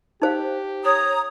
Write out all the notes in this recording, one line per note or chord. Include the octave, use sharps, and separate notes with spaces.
D#4 G4 C5 F5
C#5 A#5 D#6